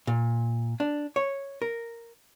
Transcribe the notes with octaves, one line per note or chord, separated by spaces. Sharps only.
A#2
D4
C#5
A#4